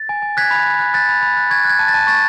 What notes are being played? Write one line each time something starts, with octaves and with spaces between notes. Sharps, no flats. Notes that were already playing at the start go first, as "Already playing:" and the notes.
Already playing: A6
G#5
G#5
F#6 G#6 B6
B5
B5
F#6
F#6 A6
B5
B5
F#6
C#6 G#6
F#6
G#6
A5
A6
A5
C#6 A6